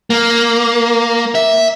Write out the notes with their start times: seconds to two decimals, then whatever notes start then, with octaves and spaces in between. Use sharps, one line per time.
0.10 A#3
1.35 E5